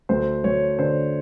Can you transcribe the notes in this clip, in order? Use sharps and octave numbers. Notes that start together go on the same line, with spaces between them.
D2 C5
D2 C#5
D3 C5